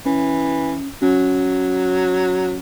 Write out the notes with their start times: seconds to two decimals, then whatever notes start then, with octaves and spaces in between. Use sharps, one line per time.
0.06 E3 C#4
1.02 F#3 C#4